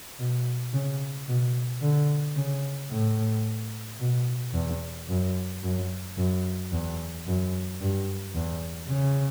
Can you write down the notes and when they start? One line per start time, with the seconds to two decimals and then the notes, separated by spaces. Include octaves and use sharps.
0.19 B2
0.73 C#3
1.28 B2
1.82 D3
2.36 C#3
2.91 A2
4.00 B2
4.54 E2
5.09 F#2
5.63 F#2
6.17 F#2
6.72 E2
7.26 F#2
7.80 G2
8.35 E2
8.90 C#3